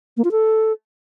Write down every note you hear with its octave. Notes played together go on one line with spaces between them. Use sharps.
A#3
F4
A4